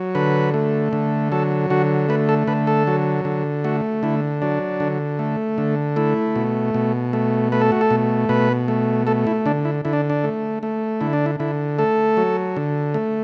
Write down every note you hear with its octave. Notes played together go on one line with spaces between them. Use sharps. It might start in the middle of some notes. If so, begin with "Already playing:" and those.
Already playing: F#3
D3 B4
A3
D3
F#3 A4
D3 F#4
A3 B4
A4
D3 B4
A4
F#3
D3
A3 F#4
D3 E4
F#3 D4
D3
A3
D3
A3 E4
B2
B2
A3
A3 B4
A4
F#4
A4
B2
B2 B4
A3
A3 A4
E4
D3 D4
E4
D3 E4
D4
D4
A3
A3
D3 E4
D4
E4
D3 E4
A3 A4
F#3
D3
A3